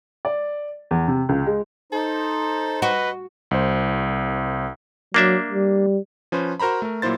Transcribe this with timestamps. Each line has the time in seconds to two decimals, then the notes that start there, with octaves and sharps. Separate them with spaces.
0.25 D5
0.91 E2
1.08 C3
1.29 C#2
1.47 G#3
1.92 D#4 A4 C5
2.82 F#4 B4 D#5
3.51 C2 C5
5.14 F#3 A#3 D4 E5
5.50 G3
6.32 F3 C#4 B4 C5
6.60 F#4 A#4 C5 A#5 B5
6.82 A3 A#4
7.02 A#2 F#3 A#3 E4 C5 A6